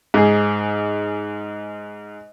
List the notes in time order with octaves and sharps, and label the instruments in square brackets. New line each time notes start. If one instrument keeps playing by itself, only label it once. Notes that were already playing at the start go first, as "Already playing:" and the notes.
[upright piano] G#2 G#4